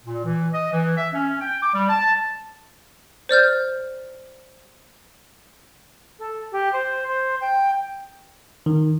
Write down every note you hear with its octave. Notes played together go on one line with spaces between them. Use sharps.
A#2
E3
D#5
E3
E5
C#4
G5
D6
G3
A5
C5 D5 F6 G6
A4
G4
C5
C5
G5
D#3